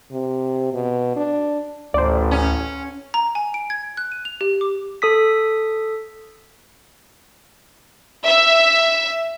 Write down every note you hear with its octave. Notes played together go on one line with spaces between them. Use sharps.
C3
B2
D4
A1 D2 C5 D5
C#4
A#5
G#5
D7
G#6
F#6
D#7
F7
G4
D6
A4 D#6 B6
E5